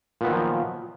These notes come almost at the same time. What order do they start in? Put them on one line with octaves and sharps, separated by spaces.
A#2 B3 D#3 F#3 F3